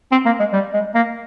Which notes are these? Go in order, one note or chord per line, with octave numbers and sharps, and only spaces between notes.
C4
A#3
G#3
G3
G#3
A#3